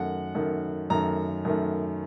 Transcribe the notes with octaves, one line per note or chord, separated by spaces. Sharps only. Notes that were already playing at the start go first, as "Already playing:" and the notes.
Already playing: F#2 D#3 A3 F#5
F#2 D#3 A3
F#2 D#3 A3 A#5
F#2 D#3 A3